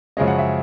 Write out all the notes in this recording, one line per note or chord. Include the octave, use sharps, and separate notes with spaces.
F#2 C#3 F3 G#3 C#4 D#5
F#5
E5